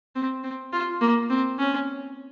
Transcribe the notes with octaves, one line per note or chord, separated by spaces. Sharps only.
C4
C4
F4
A#3
C4
C#4